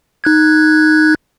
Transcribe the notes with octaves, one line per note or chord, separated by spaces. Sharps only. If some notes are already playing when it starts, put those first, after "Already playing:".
D#4 F#6 G#6